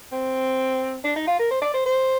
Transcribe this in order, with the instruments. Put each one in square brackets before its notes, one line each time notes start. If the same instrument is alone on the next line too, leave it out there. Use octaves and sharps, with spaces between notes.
[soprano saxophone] C4
D4
D#4
F4
A#4
C5
D5
C5
C5